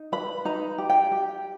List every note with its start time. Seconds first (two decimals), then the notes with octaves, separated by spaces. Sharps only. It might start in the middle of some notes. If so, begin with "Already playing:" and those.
Already playing: D#4
0.12 B4 B5
0.45 D#4 A#5
0.78 G4
0.90 G5
1.11 G4